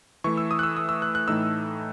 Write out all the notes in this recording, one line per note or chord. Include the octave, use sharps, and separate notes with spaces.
E3 A3 E4 C#6
E6
D#6
F#6
E6
D#6
E6
F#6
F#6
A2 E3 A3 D#4 E6